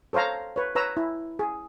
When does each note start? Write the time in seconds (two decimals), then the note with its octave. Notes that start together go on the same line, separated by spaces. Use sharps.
0.13 A4 C5 C#5 F5 A#5
0.56 B4 C#5
0.75 B4 C#5 A#5 E6
0.97 E4
1.39 G#4